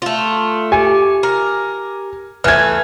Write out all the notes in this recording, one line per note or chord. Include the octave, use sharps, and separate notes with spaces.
A3 F4
G4 G#5 D6
A#4
E3 A3 B4 G#5 F6 G#6